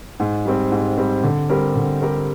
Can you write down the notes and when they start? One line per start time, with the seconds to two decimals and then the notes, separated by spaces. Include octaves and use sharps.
0.20 G#2
0.46 G3 C4
0.72 G#2
0.97 G3 C4
1.23 D3
1.49 G3 C4 G4 A#4
1.76 D3
2.02 G3 C4 G4 A#4